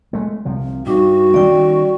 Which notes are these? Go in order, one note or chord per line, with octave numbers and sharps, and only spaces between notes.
G#3 A3
C2 C3 F3
G2 G3 D#4 F#4 D6
D#3 G3 C#4 D5 G5